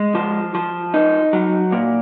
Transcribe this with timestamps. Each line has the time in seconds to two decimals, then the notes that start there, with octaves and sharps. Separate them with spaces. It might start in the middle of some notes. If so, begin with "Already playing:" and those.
Already playing: G#3
0.15 F3
0.55 F3
0.94 D#4
1.33 F#3
1.72 A#2